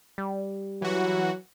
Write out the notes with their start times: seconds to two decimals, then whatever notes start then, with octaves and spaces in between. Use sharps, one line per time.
0.18 G3
0.82 E3 F#3 F#4